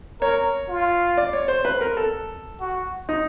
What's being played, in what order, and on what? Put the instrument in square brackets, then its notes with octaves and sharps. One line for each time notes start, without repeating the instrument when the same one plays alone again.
[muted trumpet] A#4 [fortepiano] C#5
[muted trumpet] F4
[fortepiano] D5
C#5
C5
B4
A#4
A4
[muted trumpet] F#4
[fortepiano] D#4